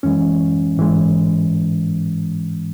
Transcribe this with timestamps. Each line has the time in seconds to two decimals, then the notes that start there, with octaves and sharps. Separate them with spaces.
0.03 F#2 E3 G#3 C#4
0.77 G#2 E3 G#3